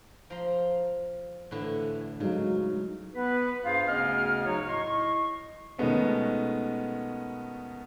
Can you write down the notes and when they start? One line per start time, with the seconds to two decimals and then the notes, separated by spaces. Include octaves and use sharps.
0.30 F3 A#5 C6
1.51 A2 D3 E3
2.20 C#3 F#3 G#3 D#4
3.14 B3 B4
3.64 G2 F4 G#4 C5 F5
3.87 D2 C#3 B3 C#4 D#5 F6
4.45 F#3 D#4 F#4 C#5
4.68 A2 D#5 C6 C#6
5.78 B2 D#3 G#3 A3 B3 C#4